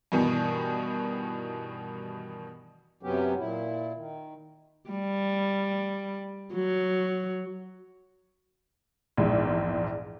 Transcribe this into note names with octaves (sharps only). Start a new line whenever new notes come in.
G2 B2 D#3 E3
F#2 C3 F#3 B3 C#4 G4
A#2 E4
D#3
G3
F#3
A#1 E2 G#2